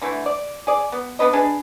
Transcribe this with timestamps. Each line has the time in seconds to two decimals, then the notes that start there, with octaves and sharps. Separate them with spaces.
0.02 D3 E3 A3
0.26 D5
0.67 G#4 D5
0.92 B3
1.19 B3 D4 B4 D#5
1.33 D4 G#4 B4